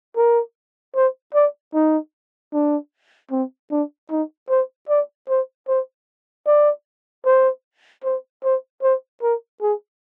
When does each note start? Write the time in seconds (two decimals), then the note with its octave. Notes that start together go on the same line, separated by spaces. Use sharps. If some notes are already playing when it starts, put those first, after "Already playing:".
0.17 A#4
0.95 C5
1.35 D5
1.74 D#4
2.53 D4
3.31 C4
3.71 D4
4.11 D#4
4.50 C5
4.89 D5
5.29 C5
5.68 C5
6.47 D5
7.25 C5
8.04 C5
8.44 C5
8.83 C5
9.22 A#4
9.62 G#4